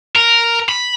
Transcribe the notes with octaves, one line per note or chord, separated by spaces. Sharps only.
A#4
B5